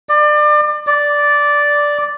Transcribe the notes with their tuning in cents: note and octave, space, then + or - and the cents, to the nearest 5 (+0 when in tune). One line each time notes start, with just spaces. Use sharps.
D5 +30
D5 -5